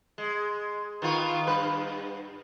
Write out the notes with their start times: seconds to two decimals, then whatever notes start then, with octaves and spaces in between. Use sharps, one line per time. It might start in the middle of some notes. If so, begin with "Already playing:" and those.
0.18 G#3
1.02 D#3 B3 F4
1.47 G2 B4